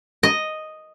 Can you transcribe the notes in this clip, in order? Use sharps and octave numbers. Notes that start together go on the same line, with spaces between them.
D#5